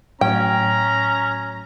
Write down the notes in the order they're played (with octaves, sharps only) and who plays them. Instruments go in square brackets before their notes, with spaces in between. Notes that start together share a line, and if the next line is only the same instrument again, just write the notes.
[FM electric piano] A2 F#3 [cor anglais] C#4 [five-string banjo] G5 [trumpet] A#5